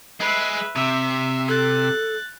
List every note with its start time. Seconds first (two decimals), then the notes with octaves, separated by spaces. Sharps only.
0.20 G#3 B4 E5
0.76 C3 E5
1.48 A4 F#6 A6